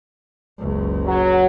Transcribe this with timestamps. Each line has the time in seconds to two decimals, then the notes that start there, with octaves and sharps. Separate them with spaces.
0.59 F#1 C#2
1.06 F#3